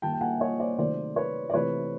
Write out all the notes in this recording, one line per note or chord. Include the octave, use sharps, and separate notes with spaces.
D#3 G3 A#3 G5 A5
G5
F#5 G#5
C#5 D#5
C5 D5
C3 D#3 F#3 A3 C5 D5
B4 C#5
D5
C3 E3 A3 B4 C#5